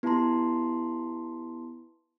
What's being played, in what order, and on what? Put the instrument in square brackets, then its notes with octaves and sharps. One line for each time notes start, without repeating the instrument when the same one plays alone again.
[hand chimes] B3 E4 G4 A5 A#5 C6